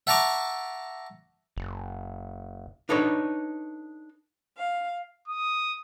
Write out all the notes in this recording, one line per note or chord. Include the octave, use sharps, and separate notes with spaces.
E5 F#5 A5 A#5 C#6 D6
F#1
D4 D#4 A4 B4 C#5
F5
D#6